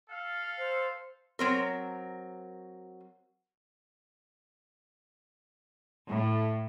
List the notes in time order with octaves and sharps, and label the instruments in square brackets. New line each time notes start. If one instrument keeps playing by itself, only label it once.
[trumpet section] A4 F5
[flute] C5
[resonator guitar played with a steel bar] F#3 C4 A#4
[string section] A2